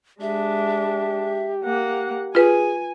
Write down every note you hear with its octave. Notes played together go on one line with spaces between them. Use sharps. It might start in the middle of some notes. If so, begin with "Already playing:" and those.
G#3 D4 G4 E5
A#3 F#5
F4 G#4 B4 G#5